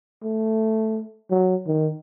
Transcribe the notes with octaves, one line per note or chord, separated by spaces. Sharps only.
A3
F#3
D#3